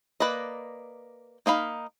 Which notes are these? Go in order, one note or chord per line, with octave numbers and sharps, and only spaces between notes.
A#3 B4 D5 D#5
A#3 D#4 F5 B5